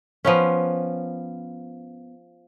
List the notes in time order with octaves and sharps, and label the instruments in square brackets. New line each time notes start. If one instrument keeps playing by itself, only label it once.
[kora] F3 B3 C#4